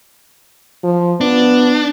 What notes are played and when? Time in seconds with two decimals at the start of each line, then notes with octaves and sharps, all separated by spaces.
0.83 F3
1.21 B3 D4